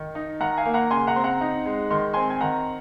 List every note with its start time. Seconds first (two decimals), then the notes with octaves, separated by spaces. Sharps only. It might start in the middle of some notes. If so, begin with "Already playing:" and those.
Already playing: D#3
0.15 D#4
0.40 D#3 F#5 A#5
0.57 F5 G#5
0.65 A#3
0.74 F#5 A#5
0.91 C#3 G#5 C6
1.07 F#5 A#5
1.16 C4 C6
1.24 F#5 A#5
1.41 D#4
1.65 G#3
1.91 D#3 C6
2.13 C4 G#5 C6
2.30 G#5
2.41 D#3 F#5 A#5